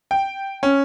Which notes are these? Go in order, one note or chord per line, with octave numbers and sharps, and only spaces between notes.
G5
C#4